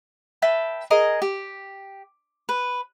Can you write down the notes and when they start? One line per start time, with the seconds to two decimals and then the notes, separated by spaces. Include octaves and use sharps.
0.42 B4 E5 G5 A5
0.90 G#4 A#4 D#5
1.22 G4
2.49 B4